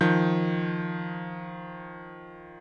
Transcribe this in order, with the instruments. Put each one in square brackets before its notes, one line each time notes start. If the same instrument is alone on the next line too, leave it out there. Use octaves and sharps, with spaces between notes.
[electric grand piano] D#3 F3 G6